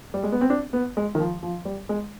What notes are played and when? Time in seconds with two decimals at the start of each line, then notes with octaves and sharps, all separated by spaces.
0.14 G3
0.23 G#3
0.32 B3
0.41 C4
0.50 D4
0.73 B3
0.97 G#3
1.15 D#3
1.20 F3
1.43 F3
1.65 G3
1.89 G#3